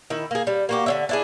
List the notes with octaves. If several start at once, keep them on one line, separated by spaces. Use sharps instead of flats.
D#3 E4
A#3 G#4
G3
A#3 F#4 G4
D3 C#4 E5
D4 E4 G#4